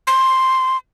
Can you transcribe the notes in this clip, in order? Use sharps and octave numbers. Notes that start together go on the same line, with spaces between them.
C6